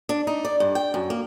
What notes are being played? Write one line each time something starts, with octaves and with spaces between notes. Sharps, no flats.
D4
D#4
D5
G2
G5
F#2
A#3